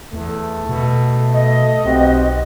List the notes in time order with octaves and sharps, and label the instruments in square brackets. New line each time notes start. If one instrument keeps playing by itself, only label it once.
[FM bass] E2 [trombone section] A3
[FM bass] B2
[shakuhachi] D#5
[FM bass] B1 [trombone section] C4 F#4 G4